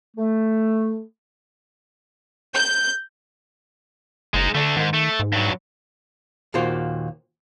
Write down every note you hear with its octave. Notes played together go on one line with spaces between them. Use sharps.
A3
G6
F#1 G#3 D#4
D3 A3 D4
G#2 D#3
A3
G#2
G2 F#3
D#2 A#2 A#3 F4 F#4 C5